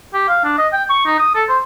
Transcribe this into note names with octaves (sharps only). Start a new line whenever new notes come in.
G4
F5
D4
D#5
G5
C#6
D#4
D#6
A4
C5